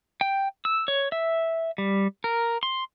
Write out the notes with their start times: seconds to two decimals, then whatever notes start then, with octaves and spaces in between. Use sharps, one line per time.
0.21 G5
0.65 E6
0.88 C#5
1.12 E5
1.78 G3
2.24 A#4
2.63 C6